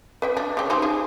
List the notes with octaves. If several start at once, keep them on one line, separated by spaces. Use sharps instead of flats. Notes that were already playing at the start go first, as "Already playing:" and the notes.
B4 E5 G5
D4
C#3 G4
D#4 G4 C5
G#4